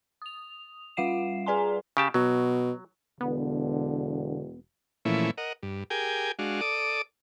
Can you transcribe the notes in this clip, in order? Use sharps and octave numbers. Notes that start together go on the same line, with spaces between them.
D#6 F7
G3 F4 F5 F#5 C7 E7
G#4 B4 D5 G#5 A#5 C6
C#3 G4 A5
B2 F#3
E1 D3 B3
A#2 E3 F3 A3 C#4 E4
A#4 D#5 F#5
G2
G4 G#4 A#4 G5 G#5
G#3 D4 F#4 F5
A4 D5 D6 D#6